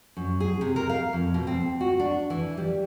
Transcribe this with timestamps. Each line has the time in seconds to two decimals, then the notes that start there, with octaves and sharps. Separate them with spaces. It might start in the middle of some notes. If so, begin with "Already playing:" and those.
0.17 F#2
0.40 G#4
0.61 C3
0.76 A#4
0.89 F5
1.13 F2
1.34 B2
1.47 C4
1.81 F#4
2.00 D4
2.30 E3
2.57 G3